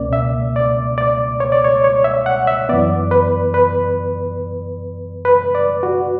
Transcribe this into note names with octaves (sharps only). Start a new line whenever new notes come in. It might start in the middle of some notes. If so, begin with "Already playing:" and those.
Already playing: C#2 B2 A#3 C#4 D5
E5
D5
D5
C#5
D5
C#5
C#5
E5
F#5
E5
F#2 E3 B3 D5
B4
B4
B4
D5
F#4